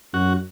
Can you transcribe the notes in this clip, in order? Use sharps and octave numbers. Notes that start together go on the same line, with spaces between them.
F#2 F#4